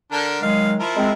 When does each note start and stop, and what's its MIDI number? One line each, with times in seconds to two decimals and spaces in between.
0.12 0.41 50
0.12 0.41 62
0.12 0.41 70
0.42 0.77 51
0.42 0.77 54
0.42 0.77 56
0.42 0.71 77
0.80 1.13 53
0.80 1.13 64
0.80 1.13 70
0.97 1.12 56
0.97 1.12 60